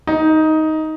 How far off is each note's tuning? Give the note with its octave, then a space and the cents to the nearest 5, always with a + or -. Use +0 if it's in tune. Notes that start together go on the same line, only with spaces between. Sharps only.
D#4 +10